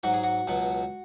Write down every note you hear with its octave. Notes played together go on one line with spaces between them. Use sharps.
G#2 F#3 F#4
G#4
F#4
C#2 B2 F#3